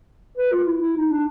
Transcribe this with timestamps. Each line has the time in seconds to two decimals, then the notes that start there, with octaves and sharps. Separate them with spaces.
0.38 B4
0.52 F4
0.67 E4
0.81 E4
0.97 D#4
1.12 D4